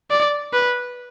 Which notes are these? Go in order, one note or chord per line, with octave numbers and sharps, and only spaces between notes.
D5
B4